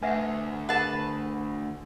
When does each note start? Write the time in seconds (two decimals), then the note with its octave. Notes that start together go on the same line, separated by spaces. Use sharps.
0.03 D2 B4 E5 F#5 G#5
0.69 G#4 A#4 B4 F#5 A5